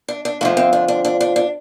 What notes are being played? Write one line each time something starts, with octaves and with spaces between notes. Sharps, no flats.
D4
D4
F2 D3 F3 A3
C4
D4
D4
D4
D4
D4